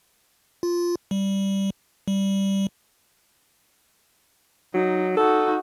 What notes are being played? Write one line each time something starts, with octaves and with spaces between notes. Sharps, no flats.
F4
G3
G3
F#3 D#4
D#4 F#4 A4